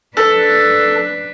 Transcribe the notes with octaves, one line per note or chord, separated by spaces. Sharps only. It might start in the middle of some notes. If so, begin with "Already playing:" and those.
D4 A4 B4